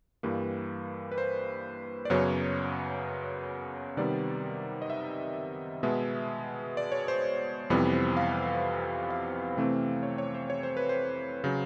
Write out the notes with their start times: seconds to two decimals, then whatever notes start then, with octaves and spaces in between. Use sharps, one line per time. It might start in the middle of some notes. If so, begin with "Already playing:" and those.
0.23 G2 E3 G3 A#3 B4
1.12 B4
1.18 C5
2.05 D5
2.10 F#2 C#3 F#3 B3 C#5
3.97 C3 D#3 G3 B3 D5
4.82 D#5
4.90 E5
5.83 B2 G#3 B3 E5
6.77 D5
6.92 C#5
7.08 C5
7.70 F2 C3 E3 G3 B3 B4
7.93 C5
8.17 F5
9.10 F5
9.57 C3 E3 A3 C4
10.03 C#5
10.18 C#5
10.34 C5
10.50 C#5
10.63 C5
10.77 B4
10.89 C5
11.44 C#3 F#3